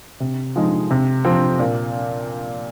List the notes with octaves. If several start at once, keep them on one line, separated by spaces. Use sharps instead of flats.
C3
F3 G#3 D#4
C3
F3 C4
A#2